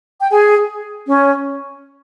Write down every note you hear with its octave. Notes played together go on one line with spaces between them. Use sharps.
G5
G#4 G#5
C#4 C#5